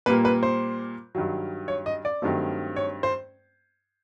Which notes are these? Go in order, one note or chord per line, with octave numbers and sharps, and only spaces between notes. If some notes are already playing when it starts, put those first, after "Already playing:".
A#2 G3 A#3 B4
B4
C5
G2 D#3 F#3
C#5
D#5
D5
G2 D#3 F#3 A3 C4
C#5
C5